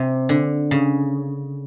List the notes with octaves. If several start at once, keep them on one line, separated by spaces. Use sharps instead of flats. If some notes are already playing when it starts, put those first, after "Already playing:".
Already playing: C3
D3
C#3